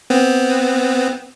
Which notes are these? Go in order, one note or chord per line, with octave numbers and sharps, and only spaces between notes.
B3 C4